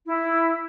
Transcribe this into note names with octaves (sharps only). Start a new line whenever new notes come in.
E4